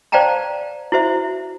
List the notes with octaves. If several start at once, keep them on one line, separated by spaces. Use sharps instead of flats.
C5 D5 F5 G5 A5 A#5
E4 F#4 C5 E5